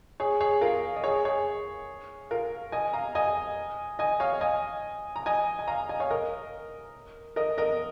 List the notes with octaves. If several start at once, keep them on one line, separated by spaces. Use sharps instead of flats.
G#4 C#5
G#4 C#5
F4 A#4
D#5
G#4 C#5
G#4 C#5
F4 A#4
D#5 G#5
F5 A#5
D#5 G#5
D#5 G#5
C#5 F5
D#5 G#5
A#5
D#5 G#5
G#5
F5 A#5
D#5 G#5
C#5 F5
A#4 D#5
A#4 D#5
A#4 D#5